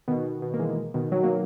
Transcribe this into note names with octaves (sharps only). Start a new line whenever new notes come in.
B2 D#3
B2
B2
A#3
E3 G#3
B2 D#3
D#3 F#3
F#3 A#3